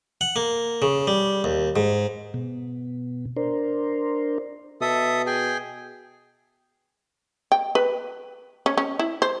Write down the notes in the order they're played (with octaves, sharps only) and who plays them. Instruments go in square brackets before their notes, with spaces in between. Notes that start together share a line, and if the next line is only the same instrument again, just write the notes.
[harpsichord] F#5
A#3
C#3
G3
D#2
G#2
[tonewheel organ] B2
D4 A#4 C5
[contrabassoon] B2 [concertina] A4 E5 D#6
[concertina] G#4 G5 G#5
[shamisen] G5
B4
C#4
C#4
E4
C5